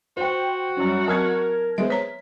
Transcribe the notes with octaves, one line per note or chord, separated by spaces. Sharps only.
F#4 C5 G5
F#2 G3 C#4
F#3 C4 A#4 A5 F6 G#6
G#3 B3 C5 E5
C#5 A#5 B6